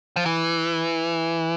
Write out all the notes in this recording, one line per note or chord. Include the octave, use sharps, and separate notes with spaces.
F3
E3